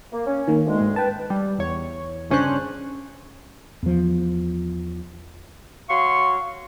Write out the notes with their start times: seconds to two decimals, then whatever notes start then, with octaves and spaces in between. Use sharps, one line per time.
0.13 A#3
0.27 C#4
0.48 D#3 A#3
0.66 D2 G#3
0.80 G#2
0.96 B4 G5 A5
1.30 G3
1.59 E2 C#5
2.30 G1 C#3 C#4 D4 C5 F#6
3.83 E2 F3
5.88 F#3 F5 C6 C#6